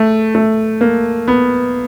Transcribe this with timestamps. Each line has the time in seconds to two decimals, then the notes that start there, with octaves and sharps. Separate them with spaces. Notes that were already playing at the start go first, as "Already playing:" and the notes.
Already playing: A3
0.35 A3
0.81 A#3
1.28 B3